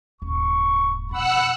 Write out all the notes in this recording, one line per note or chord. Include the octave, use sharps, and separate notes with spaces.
D#1 G#2 C#6
F2 B2 F#5 B5 E6 F#6